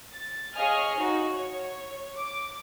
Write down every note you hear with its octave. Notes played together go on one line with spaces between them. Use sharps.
A6
G#4 C#5 D#5 F5 G#5 F6
D#4 F#4
C#5
D6